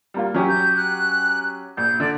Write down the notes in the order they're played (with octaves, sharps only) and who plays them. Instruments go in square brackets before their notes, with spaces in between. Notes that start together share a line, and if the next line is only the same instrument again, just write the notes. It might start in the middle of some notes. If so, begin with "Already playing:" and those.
[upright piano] G3 A#3 F4
F#3 C#4 G4
[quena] G6
F#6
[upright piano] A#1 [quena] G6
[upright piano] D3 [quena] D5